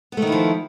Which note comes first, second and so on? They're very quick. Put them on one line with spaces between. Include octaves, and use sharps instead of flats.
B3 A3 D#3 E4 F3